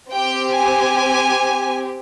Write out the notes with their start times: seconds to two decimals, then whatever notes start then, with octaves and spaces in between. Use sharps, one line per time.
0.11 C4 G4 G5
0.56 G#5